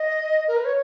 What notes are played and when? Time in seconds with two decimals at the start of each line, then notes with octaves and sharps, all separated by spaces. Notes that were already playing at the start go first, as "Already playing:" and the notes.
Already playing: D#5
0.48 A#4
0.56 B4
0.65 C#5